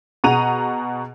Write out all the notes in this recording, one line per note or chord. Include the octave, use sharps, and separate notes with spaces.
B2 G#4 F#5 A#5 D#7 F7